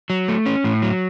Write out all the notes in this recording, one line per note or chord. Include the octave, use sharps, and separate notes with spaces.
F#3
A3
C#4
A2
F#3